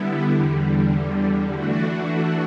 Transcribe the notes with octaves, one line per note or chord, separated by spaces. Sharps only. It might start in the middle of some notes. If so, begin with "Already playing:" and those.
Already playing: D3 G3 B3 E4
E2 D3 G3
E3 A3 D4 F#4